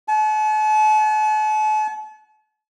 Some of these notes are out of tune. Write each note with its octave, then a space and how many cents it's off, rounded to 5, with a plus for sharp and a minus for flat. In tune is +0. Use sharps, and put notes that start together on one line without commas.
F#5 +0 A5 -40